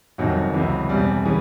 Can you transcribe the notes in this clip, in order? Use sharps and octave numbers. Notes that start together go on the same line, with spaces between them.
G1 F2 C3 D#3 F#3
C#2 C3 E3
E1 E2 C3 G3
C#3 E3